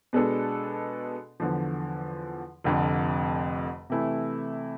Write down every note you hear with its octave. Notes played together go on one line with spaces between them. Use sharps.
B2 G#3 B3 D4 A4
E2 D3 F3
F1 F2 D3
C3 E3 A3 E4